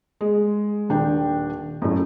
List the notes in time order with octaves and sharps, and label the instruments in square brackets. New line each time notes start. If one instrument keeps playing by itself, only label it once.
[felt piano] G#3
D#1 D4 G5
F#2 A2